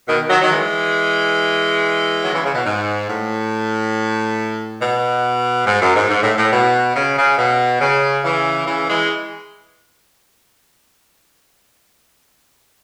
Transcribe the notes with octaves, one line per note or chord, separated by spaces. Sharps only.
B2 D#3
D#3 F#3
D#3 F#3
E3 G#3
D#3 F#3
C#3 E3
C#3
B2
G#2
A2
B2
G#2
F#2
G#2
G#2
A2
A2
B2
C#3
C#3
B2
C#3
C#3 E3
C#3 E3
E3 G#3